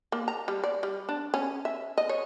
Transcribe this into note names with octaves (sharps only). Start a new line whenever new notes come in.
A#3
A#5
G3
D5
G3
D4
C#4
E5
D#5
C#5